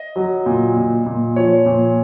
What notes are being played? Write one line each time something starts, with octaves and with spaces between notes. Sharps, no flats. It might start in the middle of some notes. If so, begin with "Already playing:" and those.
Already playing: D#5
F#3
A#2
A#2
A#2
F3 C#5
A#2